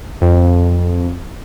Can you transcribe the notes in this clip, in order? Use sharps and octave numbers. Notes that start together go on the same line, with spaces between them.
F2